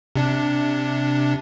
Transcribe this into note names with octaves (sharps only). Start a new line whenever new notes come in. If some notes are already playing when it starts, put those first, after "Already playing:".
C3 D4